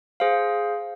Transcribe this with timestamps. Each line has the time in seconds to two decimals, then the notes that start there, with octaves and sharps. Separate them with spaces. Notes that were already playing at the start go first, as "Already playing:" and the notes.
0.20 G#4 C5 F5